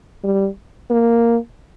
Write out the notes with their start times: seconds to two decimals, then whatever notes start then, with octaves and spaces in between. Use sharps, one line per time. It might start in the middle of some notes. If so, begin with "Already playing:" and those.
0.24 G3
0.90 A#3